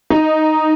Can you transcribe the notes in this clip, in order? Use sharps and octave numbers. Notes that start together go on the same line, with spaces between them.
D#4